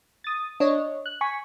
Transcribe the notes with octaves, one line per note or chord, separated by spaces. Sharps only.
D#6 A6
D4 C#5 D#5
F#6
G#5 C#6 B6